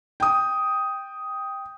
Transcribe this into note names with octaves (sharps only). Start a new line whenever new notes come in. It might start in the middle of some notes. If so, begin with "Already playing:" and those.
G5 D#6